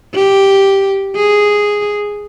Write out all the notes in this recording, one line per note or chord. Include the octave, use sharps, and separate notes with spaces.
G4
G#4